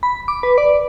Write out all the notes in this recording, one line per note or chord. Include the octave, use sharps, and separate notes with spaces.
B5
D6
B4
D5